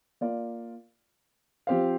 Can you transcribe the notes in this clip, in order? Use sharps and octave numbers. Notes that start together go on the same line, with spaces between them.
A#3 F4 D5 F5
F3 C4 G4 C5 F5